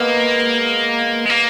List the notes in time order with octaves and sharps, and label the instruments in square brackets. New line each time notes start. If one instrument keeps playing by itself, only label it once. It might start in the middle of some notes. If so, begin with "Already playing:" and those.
Already playing: [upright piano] G#3 B3 [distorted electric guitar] A#3
[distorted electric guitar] G#3
A#3